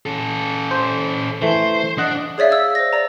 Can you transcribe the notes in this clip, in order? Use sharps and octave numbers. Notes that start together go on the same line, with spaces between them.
C#4 A4
C5
E3 A3 C5
D4 D#5 F#5
G#4 C#5 D5 E5 F5
E6
C5 A#6
D5 A#5